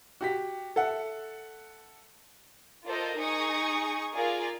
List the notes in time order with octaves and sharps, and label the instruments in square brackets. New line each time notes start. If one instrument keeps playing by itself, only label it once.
[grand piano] F#4 G4 B6
A4 E5 F#5
[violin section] F4 A4 A#4 C5 D5 D#5
D#4 G#4 C#6 D#6 C#7
F4 G#4 A#4 D5 F5